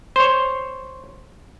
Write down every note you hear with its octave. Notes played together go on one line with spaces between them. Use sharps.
C5 C#5